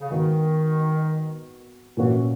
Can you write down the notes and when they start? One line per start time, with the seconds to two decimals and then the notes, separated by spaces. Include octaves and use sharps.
0.01 C#3
0.10 D#3 G#3 B3 F#4
1.97 A#2 E3 A#3 C#4 F#4